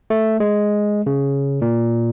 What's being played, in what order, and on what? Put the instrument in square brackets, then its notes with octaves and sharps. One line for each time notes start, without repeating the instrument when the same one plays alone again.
[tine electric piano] A3
G#3
C#3
A#2